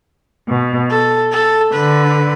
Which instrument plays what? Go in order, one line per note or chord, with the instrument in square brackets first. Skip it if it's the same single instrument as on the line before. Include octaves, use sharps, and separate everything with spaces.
[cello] B2
[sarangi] A4
A4
[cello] D3 [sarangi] B4